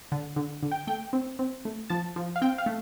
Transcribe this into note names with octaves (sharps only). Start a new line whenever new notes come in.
D3
D3
D3
G5
A3 G5
C4
C4
A3
F3 A5
F3
F5
C4 G5
F5
A3